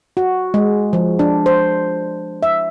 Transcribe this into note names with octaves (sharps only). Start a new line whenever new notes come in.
F#4
G#3
F3
D4
C5
E5